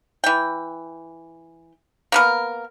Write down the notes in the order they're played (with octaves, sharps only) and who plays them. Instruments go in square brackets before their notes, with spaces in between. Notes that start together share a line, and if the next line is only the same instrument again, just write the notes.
[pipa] E3 G5
A#3 B3 A#4